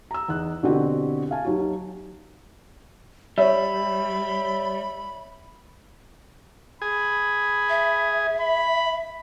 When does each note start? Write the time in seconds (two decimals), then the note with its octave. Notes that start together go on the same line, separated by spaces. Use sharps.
0.11 A#5 E6
0.28 E2 D#4 F#6
0.63 B2 D3 C4 E4 F#4 G4
1.31 F5 G#5 A5
1.45 D#2 D#3 F#3 F#4
3.38 G3 C#5 E5 B5
6.82 G#4 B5
7.69 E5
8.41 B5